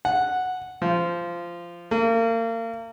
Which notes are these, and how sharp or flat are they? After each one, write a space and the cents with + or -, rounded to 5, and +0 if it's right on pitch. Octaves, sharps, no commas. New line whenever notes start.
F#5 -5
F3 -15
A#3 -35